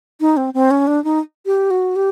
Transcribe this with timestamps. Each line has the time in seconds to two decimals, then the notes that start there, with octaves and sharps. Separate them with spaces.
0.21 D#4
0.37 C4
0.54 C4
0.71 C#4
0.87 D4
1.04 D#4
1.46 G4
1.71 F#4
1.96 G4